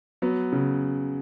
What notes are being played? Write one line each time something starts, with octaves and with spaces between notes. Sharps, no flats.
F#3 B3
C#3